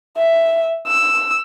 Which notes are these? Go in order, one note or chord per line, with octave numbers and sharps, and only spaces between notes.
E5
E6